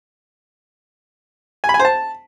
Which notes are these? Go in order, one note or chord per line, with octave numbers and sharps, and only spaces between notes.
G#5
B5
G#5
C5
A5